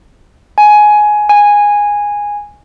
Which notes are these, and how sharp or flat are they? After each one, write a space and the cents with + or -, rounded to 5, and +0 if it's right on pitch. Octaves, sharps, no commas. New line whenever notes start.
G#5 +15
G#5 -10